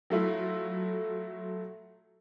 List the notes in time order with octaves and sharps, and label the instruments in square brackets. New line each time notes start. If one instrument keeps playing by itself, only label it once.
[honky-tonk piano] F#3 A3 E4 F4